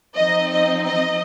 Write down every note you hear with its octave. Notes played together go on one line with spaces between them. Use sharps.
F3 C4 D#4 D#5
D#5
D#5